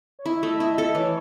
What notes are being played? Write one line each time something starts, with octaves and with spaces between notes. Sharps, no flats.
C#5
E4 D#5
E5
A3 D#5
E5
E4 D#5
A4
E3 C#5